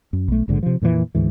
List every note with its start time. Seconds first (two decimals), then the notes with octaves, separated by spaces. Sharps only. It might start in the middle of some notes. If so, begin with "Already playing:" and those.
0.13 F#2
0.28 B1 A3
0.48 A#1 G#2 D3
0.63 C3 F3
0.82 F2 A#2 D3 E3
1.15 D2 G#2 E3